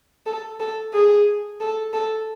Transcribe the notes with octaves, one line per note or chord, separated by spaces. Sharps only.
A4
A4
G#4
A4
A4